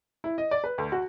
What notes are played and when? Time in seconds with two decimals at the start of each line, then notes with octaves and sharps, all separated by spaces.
0.24 E4
0.38 D#5
0.51 D5
0.64 B4
0.78 D2
0.92 F#4